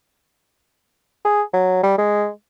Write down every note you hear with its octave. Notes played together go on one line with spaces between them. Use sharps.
G#4
F#3
G3
G#3